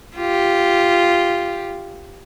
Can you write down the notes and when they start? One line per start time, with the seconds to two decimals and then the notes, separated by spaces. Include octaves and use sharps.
0.16 F4 G4